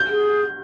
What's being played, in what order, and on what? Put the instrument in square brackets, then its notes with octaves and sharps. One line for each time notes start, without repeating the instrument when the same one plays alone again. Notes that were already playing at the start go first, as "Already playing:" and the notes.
Already playing: [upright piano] G6
[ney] G#4